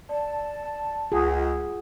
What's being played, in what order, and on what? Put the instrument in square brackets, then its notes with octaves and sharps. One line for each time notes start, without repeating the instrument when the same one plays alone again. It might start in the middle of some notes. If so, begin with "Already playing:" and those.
[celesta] D5 [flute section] A5
[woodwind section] C#2 [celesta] F4 F#5 D#6 [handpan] G#4